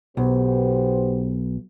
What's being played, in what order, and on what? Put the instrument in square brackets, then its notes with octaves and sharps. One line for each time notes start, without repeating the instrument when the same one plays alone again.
[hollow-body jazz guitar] B1 [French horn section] B3 G4 C5